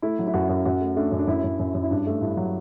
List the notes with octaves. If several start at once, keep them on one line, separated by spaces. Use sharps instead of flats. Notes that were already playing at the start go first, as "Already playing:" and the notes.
A3 E4
F#3
E4
F#2 F#4
F#2
F#2 F#4
A3
A3 D4
F#2
D4
F#2 E4
F#2
F#2 E4
F#2
E4
G2 D4
A3
G2 E4
F#3